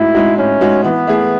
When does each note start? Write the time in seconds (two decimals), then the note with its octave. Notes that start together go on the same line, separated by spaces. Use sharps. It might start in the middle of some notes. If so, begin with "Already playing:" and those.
Already playing: A2 G#3 D#4 E4 F#4
0.14 G#3 D#4 F#4
0.38 A2 C#4
0.61 G#3 D#4 F#4
0.84 E3 B3
1.07 A3 E4 G#4